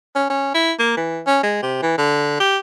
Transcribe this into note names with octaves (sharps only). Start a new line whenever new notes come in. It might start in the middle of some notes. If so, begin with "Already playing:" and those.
C#4
C#4
E4
A#3
E3
C#4
G#3
C3
E3
D3
G4